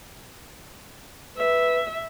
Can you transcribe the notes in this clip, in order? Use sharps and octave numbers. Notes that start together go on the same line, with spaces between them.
B4 E5